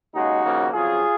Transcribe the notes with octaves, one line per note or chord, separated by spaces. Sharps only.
D#2 C#3 G#3 D#4 F#4
D#2 C#3 F3 A#3
F2 C#3 F#3 F4 G#4